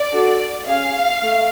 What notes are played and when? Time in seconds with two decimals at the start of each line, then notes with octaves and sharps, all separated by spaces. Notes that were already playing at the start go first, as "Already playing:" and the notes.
Already playing: D5
0.12 D4 F#4 A4
0.66 C#4 G#4 F5
1.21 A3